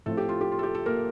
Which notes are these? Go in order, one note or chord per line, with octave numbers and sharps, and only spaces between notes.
A2 F3 A3 C4 A4
G4
F4
G4
F4
A4
G4
A4
A#3 A#4